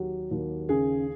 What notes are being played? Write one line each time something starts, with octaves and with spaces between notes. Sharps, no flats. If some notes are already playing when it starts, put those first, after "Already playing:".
Already playing: D#2 F#3 G4
D#2
C#3 G#4